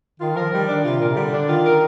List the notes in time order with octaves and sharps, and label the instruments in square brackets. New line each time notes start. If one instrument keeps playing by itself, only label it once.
[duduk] D#3 [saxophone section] F4
[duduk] F3 [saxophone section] A#4
[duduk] D#3 [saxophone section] G3
[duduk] D#3 [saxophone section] D4
[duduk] C3 [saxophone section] F4
[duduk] A#2 [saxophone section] A#4
[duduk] C3
[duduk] D3 [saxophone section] G3
[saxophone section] D4
[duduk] D#3 [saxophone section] F4
[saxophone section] A#4